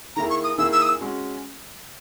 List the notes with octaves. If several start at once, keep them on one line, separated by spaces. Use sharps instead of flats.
D#3 A#3 E4 G#4 A#5
C#6
D#6
D#3 A#3 E4 G#4 E6
E6
D#6
E6
G#3 C#4 F#4